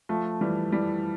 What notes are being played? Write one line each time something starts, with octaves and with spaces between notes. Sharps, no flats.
F3 A3
E3 G3
E3 G3